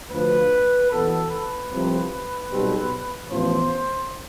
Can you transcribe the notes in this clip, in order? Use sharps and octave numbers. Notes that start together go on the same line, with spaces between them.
D2 D3 F3 B4
E2 B2 B3 A4
B4
C2 C3 F3
B1 B2 G3 C4
A1 A2 F3 B3 C5